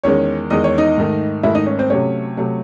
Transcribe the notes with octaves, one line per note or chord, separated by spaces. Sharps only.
E2 D#3 G#3 C#4 C#5
E2 D#3 G#3 D#5
C#5
D#4 D#5
G#2 D#3 A3
G#2 D#3 A3 E4 E5
D#4 D#5
C#4 C#5
C4 C5
C3 F#3 A3 C#4 C#5
C3 F#3 A3